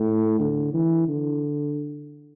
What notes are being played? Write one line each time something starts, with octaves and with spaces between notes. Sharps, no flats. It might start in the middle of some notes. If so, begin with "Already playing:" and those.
Already playing: A2
D3
E3
D3